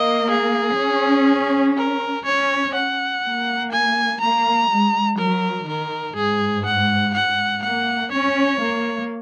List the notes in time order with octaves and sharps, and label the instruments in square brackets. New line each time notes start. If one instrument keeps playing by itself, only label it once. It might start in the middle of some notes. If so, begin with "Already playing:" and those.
Already playing: [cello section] A#3 [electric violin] D#5
[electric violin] G#4
[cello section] C#4
[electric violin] A#4
[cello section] C#4 [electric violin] C#5
[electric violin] F#5
[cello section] A#3
[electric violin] G#5
[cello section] A#3 [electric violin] A#5
[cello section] G#3
[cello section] F#3 [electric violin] A#4
[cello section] D#3 [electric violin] A#4
[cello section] G#2 [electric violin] G#4
[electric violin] F#5
F#5
[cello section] A#3 [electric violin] F#5
[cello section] C#4 [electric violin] C#5
[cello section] A#3